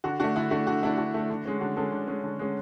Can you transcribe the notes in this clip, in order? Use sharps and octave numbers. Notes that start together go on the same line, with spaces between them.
D3 F#4
A3 D4 F#4
D3 E4
A3 D4 F#4
D3 F#4
A3 D4 E4
D3 F#4
A3 D4
D3
G#3 C#4
D3 F#4
G#3 C#4 A4
D3
G#3 C#4
D3
G#3 C#4